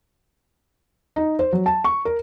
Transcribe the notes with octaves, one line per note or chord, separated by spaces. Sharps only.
D#4
C5
F#3
A5
C#6
A#4